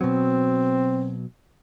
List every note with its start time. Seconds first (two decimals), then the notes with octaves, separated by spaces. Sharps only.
0.01 B2 F#3 C4